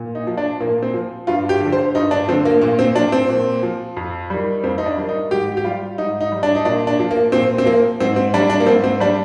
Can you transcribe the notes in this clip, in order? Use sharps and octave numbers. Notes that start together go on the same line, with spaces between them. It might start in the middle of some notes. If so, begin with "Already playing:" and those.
Already playing: A#2
D#4
F3
D4
A#2 A#3
C4
F3
G2 F4
G4
D3
F3
C5
G2 D#4
D4
D3 F3 C4
A#3
A#2 A#3
C4
F3 D4
C4
A#2
F3
F2
D#3 G3
F2 C4
D#4
D4
D#3 G3
D#4
G#2 G4
G4
G3 F4
G#2 D#4
D#4
G3
D4
D#4
A#2 D4
D4
F3
A#3
A#2 C4
C4
F3 A#3
G#2 C4
C4
G3 D4
D4
A#3
G#2 C4
C4
G3 D4